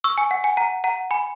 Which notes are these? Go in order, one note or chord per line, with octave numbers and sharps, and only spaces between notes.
C#6 E6
G#5
F#5
G#5
F#5 A#5
F#5 A#5
G#5 B5